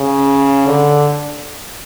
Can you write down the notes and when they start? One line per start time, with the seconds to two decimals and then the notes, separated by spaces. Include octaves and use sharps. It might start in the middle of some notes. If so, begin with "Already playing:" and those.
Already playing: C#3
0.66 D3